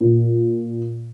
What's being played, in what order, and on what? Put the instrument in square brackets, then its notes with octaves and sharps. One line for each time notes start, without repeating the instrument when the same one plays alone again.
[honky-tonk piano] A#2